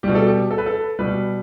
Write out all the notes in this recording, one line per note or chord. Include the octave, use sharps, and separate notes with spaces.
B2 G3 G4
A4
G4
A4
B4
A4
B2 G3 B4